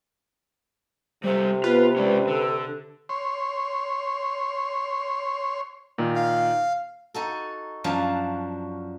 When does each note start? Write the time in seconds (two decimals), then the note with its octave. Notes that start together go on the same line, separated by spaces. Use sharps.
1.24 C3 G3 A4 C5
1.64 B3 F4 B4
1.97 G#3 C#4 D5
2.28 D3 A4
3.09 C#5 C6
5.98 A#2 D#3
6.16 F5
7.14 D#4 F#4 A4
7.84 F#2 F3 D4 F#4 F5 A5